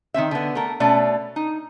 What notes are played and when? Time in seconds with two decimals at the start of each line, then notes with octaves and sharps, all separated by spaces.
0.14 D#3 G#3 C4 E5
0.31 D3 B3
0.55 A3 A#4
0.80 B2 A3 C#4 D5
1.36 D#4